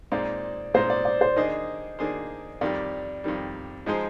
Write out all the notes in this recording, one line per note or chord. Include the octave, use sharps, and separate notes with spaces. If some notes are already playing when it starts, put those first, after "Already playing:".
A#2 G#3 C4 D#4 D5
A#2 G#3 C4 D#4 C5
D5
D5
C5
D#3 A#3 D4 G#4 C5 D#5
D#3 A#3 D4 G#4 C5
F2 D#3 G3 D5
F2 D#3 G3
F3 G#3 D#4 G#4 C5 D#5